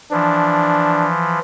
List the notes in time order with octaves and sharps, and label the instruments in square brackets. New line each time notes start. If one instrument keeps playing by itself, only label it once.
[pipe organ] E3 F3 [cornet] D4